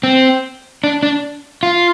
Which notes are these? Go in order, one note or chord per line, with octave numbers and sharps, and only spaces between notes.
C4
D4
D4
F4